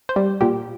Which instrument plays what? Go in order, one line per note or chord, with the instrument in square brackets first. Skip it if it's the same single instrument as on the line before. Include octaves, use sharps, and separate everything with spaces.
[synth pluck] C5
G3
A#2 G4